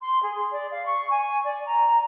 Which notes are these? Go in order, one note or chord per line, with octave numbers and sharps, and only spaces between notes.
C6
G#4
D5
F5
C#6
G#5
D5
A#5